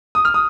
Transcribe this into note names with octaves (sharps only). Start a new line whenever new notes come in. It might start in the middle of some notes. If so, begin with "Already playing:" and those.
D#6
F6
D#6